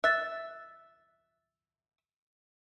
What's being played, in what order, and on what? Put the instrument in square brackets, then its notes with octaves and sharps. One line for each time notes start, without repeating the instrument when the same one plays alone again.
[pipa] E5 [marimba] F#6 A6